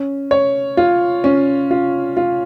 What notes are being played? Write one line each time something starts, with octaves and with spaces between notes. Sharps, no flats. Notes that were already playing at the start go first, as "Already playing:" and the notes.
Already playing: C#4
C#5
F4
C#4
F4
F4